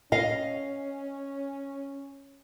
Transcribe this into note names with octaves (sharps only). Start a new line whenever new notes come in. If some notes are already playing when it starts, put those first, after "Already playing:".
C#4 D#5 F5